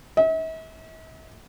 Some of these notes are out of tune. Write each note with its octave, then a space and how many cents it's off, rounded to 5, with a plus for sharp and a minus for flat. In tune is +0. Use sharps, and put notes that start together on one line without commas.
E5 -45